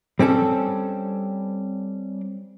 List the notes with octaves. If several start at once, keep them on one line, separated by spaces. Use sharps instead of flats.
G3 C4 C#4 A4